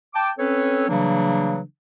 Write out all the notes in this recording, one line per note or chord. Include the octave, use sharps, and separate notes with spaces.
G5 A5 D6
C4 C#4 A4 B4 C#5
C#3 E3 F#3 G3 A#3 D4